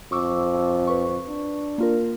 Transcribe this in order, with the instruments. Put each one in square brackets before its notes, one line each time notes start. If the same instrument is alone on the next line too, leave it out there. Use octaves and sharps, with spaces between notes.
[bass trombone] F2 [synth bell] C#6 D6 E6
[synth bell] B4 C#6
[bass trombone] D4
[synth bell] A#3 F4 A#4